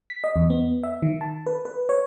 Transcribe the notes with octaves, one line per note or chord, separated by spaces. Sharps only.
B6
D#5
E2
B3
E5
D#3
A5
B4
B4
C#5